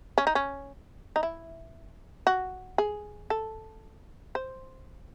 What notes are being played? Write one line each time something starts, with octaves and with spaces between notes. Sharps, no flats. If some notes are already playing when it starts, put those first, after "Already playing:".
C#4
D#4
C#4
D#4
E4
F#4
G#4
A4
C5